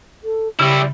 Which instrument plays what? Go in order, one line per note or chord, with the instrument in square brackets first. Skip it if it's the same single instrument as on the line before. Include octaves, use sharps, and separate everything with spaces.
[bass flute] A4
[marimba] C#3 [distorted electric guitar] G3 E4 [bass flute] G4